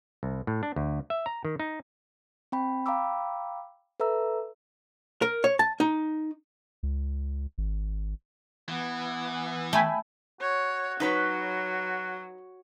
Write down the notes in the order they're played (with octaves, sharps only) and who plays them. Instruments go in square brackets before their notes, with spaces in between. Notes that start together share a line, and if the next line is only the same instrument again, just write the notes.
[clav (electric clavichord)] C2
A2
D4
D2
E5
A#5
D#3
D#4
[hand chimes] C4 G5 B5
F5 G5 A#5 B5 D6 E6
A4 B4 E5 A#5 E6
[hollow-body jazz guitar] A#4
C#5
A5
D#4
[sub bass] C#2
G#1
[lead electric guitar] E3 [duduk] B3
[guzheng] A3 [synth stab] G5 G#5 B5
[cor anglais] F#4 [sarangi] C#5
[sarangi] F#3 [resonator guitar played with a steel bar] D#4 B4 C#5